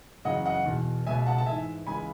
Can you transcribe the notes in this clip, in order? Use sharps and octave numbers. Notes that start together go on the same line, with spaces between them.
F#2 C#3 E3 D#5 F#5
D#5 F#5
E2 B2
C#2 B2 E5 G#5
F#5 A5
A5
G#2 E3 E5 G#5
C#2 C#3 E3 G#5 B5